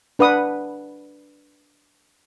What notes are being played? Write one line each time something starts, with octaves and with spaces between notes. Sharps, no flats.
D4 B4 F#5 D#6